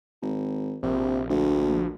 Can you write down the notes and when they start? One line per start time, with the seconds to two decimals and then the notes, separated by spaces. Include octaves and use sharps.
0.22 G#1
0.83 A#1 C3
1.30 D2